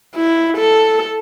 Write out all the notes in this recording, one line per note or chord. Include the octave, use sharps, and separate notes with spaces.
E4
A4